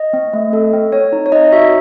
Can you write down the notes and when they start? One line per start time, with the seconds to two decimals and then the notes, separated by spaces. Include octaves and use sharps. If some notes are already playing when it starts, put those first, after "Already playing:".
Already playing: D#5
0.13 C4
0.33 A3
0.53 A4
0.73 C4
0.92 C4 C#5
1.13 D#4
1.26 C#5
1.32 D#4 D#5
1.52 F#4 E5